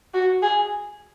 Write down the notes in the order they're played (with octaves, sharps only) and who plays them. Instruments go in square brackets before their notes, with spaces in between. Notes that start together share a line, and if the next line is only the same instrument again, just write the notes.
[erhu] F#4
G#4